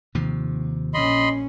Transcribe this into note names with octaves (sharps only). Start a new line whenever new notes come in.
D#2 C3 F3
A#1 C#4 D#5 B5 C6